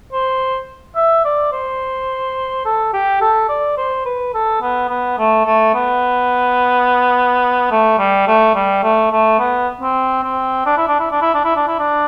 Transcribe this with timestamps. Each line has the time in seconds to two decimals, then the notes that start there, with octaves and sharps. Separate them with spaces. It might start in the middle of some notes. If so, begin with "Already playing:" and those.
0.13 C5
0.96 E5
1.25 D5
1.52 C5
2.65 A4
2.93 G4
3.21 A4
3.49 D5
3.77 C5
4.06 B4
4.34 A4
4.62 B3
4.89 B3
5.19 A3
5.45 A3
5.75 B3
7.71 A3
7.99 G3
8.27 A3
8.55 G3
8.83 A3
9.12 A3
9.39 B3
9.81 C4
10.23 C4
10.66 D4
10.78 E4
10.88 D4
11.00 E4
11.11 D4
11.22 E4
11.34 D4
11.45 E4
11.56 D4
11.68 E4
11.79 D4